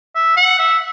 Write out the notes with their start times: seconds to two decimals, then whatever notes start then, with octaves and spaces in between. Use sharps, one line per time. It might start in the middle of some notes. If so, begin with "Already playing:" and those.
0.15 E5
0.37 F#5
0.59 E5